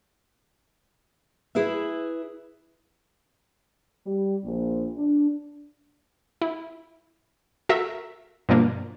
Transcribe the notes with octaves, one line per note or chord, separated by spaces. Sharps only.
E4 G#4 B4 E5
G3
A#1
D4
E4
F#4 A4 A#4 E5
G2 B2 F3 A#3 D4